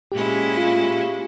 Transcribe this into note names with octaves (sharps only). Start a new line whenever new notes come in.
A#2 G#3 C#4 E4 G4
F4